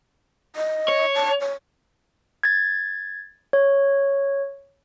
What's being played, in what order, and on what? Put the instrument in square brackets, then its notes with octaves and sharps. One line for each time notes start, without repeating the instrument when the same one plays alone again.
[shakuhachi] D#5
[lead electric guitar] C#5
[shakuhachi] A5
C#5
[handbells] G#6 A6
C#5